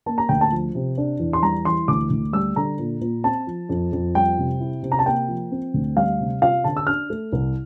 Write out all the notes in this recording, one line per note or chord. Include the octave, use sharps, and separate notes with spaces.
A#3 A5
A#5
D2 G5
A5
F3
C3
D4
E2
C6
G3 A#5
E3 C6
D2 D6
D2
G3 E6
D3 A#5
A#2
A#2
C4 A5
F3
F2
F2
G3 G5
C3
E4
C3
A#5
A5
A#3 G5
F3
C4
D2
G3 F5
C3
F4 F5
D3 A5
E6
D4 F6
A3
C2